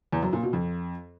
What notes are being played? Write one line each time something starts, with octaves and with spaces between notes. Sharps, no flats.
E2
F#2
A#2
B2
F2